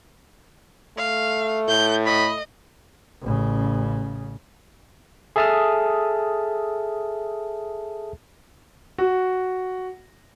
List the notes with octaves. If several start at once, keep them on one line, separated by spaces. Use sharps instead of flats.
A3 F5
A2 G6
D#5 B5
A1 C#3
G#4 A4 E5 A5 D#6 F6
F#4